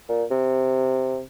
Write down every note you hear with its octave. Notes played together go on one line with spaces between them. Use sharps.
A#2
C3